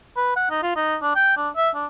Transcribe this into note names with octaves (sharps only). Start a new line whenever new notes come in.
B4
F#5
D#4
F4
D#4
D4
G5
D4
E5
D4